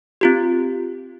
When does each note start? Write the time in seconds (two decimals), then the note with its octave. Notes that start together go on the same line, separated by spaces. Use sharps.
0.21 C4 F4 G4